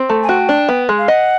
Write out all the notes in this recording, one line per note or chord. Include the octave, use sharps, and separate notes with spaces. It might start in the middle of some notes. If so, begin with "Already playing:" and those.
Already playing: C4
A3
G#5
F#4 G5
D4
B3
G#3
F5
D#5 F#5